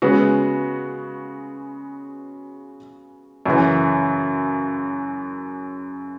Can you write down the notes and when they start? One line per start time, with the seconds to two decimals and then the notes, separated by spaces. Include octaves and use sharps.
0.02 C#3 G#3 B3 F#4
3.46 F#2 C#3 E3